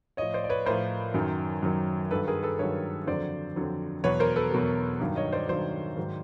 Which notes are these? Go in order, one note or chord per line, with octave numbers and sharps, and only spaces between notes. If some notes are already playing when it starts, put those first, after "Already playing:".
A2 F3 C#5 D#5
C5 D5
D5
B4 C#5
A2 F3 A#4 C5
F#2 D#3 F#3
F#2 D#3 F#3
G2 D#3 F#3 A4 B4
G#4 A#4
A4 B4
G2 D#3 F#3 B4 C#5
F2 D3 F#3 C5 D5
F2 D3 F#3
E2 B2 F#3 B4 C#5
A#4 C5
A4 B4
E2 B2 F#3
G2 D#3 F#3
C#5 D#5
C5 D5
G2 D#3 F#3 C5 D5
G#2 D#3 F#3